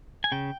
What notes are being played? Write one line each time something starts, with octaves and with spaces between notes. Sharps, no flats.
G#5
C#3 G5